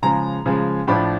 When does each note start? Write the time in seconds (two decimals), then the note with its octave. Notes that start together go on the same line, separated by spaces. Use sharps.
0.03 C#3 F3 G#3 A#5
0.46 C#3 F3 G#3
0.87 A2 F3 A3 D4 B5